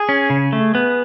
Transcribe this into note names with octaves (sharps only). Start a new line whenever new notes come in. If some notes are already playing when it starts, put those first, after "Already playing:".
Already playing: G#4
C#4
C#3
A3
B3